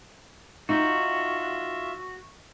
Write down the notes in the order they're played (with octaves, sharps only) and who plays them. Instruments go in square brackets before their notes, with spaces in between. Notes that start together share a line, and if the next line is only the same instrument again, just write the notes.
[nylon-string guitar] D#4 [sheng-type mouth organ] F4 E5 [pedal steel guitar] F#4 [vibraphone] C#6